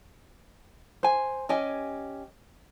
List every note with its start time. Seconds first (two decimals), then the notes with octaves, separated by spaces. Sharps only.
1.03 C5 G#5
1.49 C#4 G4 D#5 G#5